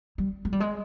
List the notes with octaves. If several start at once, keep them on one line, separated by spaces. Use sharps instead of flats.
G3
G#3
G3
G#3